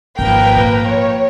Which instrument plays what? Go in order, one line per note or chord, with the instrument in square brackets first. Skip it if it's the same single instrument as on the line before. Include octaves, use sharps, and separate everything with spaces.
[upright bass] G#1 [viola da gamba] F3 A#3 A#4 [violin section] B4 G5
[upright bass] A#2
[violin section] C#5